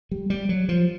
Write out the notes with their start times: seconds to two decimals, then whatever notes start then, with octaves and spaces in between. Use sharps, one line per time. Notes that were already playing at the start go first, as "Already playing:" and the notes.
0.11 G3
0.30 G3
0.49 F#3
0.69 F3